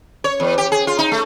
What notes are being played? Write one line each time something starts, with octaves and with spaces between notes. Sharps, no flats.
C#5
E2
G4
G#4
F4
D#4
A3